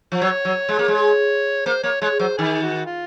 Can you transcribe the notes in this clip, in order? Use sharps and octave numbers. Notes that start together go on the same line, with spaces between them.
F3
F#3 C#5
F#3
G#3
A#3
G#3
C#5
A#3 C5
A#3 C#5
G#3 C#5
F#3 C5
D#3 G#4
F#4
F4